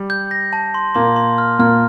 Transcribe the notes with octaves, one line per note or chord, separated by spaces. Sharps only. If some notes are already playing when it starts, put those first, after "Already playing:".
Already playing: G3 G4
G6
A#6
A5
C6
A#2 A#3 C6
C6
F6
A#2 A#3 F6